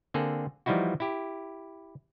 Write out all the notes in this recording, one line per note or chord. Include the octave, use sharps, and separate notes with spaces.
D3 A#3 C4 G#4 A4
E3 F3 G3 D#4 E4 F#4
E4 G4